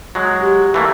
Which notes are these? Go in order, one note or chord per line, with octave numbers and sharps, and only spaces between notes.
F#3 G#3
G4
E3 A3 A#3